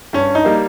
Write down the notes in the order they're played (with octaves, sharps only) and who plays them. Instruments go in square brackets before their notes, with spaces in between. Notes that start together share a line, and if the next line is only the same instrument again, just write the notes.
[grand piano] G2 C#4
D#4
G3 A#3